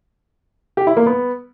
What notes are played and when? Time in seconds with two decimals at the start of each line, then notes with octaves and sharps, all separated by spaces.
0.77 G4
0.87 E4
0.97 A#3
1.06 B3